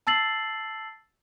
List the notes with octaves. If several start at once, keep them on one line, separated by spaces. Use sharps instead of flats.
A5 E6 A6 C7 F#7